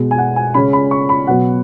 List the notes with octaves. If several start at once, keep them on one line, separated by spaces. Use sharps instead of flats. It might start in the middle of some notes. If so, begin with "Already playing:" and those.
Already playing: B2 G#3 B3
G#5
F#5
G#5
C#3 G#3 C#4 B5
B5
C#6
B5
B2 F#3 B3 F#5